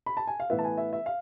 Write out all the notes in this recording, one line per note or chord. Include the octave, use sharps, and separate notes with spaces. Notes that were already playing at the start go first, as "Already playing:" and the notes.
B5
A5
G#5
F5
A2 E3 B3 E5
A5
G#5
E5
E5
F5